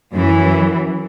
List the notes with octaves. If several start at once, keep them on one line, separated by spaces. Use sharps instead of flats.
F#2 E3